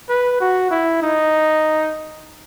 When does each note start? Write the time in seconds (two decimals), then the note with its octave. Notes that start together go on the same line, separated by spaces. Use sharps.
0.09 B4
0.41 F#4
0.71 E4
1.02 D#4